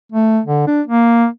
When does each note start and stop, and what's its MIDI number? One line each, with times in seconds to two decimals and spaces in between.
0.12 0.40 57
0.45 0.64 50
0.67 0.81 62
0.87 1.27 58